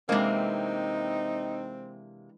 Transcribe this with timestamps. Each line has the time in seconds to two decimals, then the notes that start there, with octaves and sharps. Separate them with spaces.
0.09 C3 E3 G#3 A#3 C4 D4 D#4